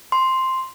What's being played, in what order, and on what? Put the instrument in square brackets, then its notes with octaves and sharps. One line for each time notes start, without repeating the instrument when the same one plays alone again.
[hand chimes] C6